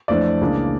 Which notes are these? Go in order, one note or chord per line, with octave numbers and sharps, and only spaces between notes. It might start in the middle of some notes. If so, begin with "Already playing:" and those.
F2 E3 A3 D4 D5
C#2 C#3 E3 A#3 D4